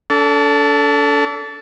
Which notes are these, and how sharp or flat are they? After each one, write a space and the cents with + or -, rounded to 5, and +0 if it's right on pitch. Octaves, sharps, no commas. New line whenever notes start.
D4 -45 A4 +0